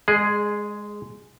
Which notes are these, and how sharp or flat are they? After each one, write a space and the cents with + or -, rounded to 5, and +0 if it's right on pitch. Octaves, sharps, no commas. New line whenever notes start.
G#3 -5 G#4 +5 D#5 -45